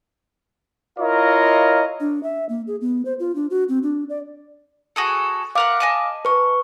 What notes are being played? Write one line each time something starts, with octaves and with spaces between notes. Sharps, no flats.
E4 F4 A#4 C#5 D#5 F5
D4
E5
A#3
G#4
B3
C5
F4
D4
F#4
C4
D4
D5
F#4 G#4 A4
A3 A#4 F5 F#5 D6
D#5 G#5 A5
B4 C#6